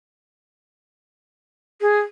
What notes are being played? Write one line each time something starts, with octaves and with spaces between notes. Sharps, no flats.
G#4